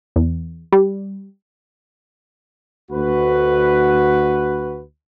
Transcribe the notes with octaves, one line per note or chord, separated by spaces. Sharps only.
E2
G3
D2 F#4 B4